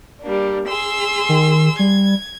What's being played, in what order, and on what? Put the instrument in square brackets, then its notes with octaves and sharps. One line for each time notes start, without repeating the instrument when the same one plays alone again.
[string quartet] G3 A#3 D4
G#4 C6 E6
[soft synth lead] D#3
[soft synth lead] G3 [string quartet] G#6